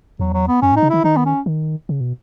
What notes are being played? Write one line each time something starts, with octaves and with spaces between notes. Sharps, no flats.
E2 F#3
F#3
B3
F#2 C#4
A2
D#4
C#3
D#3 E4
D#3 D#4
B3
C#4
D#3
C#3
B2